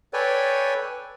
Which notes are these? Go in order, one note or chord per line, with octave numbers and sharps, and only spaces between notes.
A4 B4 C#5 D5 G5 G#5